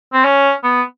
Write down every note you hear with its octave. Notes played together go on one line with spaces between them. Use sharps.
C4
C#4
B3